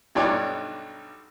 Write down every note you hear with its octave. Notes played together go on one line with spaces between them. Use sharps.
B1 G2 D#4 G4 C#5 D5